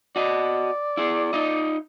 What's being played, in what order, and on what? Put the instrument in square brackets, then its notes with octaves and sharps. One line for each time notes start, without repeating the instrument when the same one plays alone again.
[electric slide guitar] F#4 D#5 [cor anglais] D5
[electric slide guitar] E4 G#4
D#4 F4 D#5